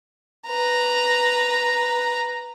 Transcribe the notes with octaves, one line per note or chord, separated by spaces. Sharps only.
B4 A#5